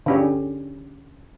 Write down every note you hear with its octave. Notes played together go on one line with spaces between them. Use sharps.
D3 C#4 G4